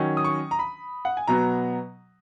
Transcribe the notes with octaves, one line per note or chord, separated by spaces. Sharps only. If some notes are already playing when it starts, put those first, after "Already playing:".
Already playing: D#3 F#3 C#4
D#6
C#6
A#5
B5
F#5
G#5
B2 F#3 B3 A#5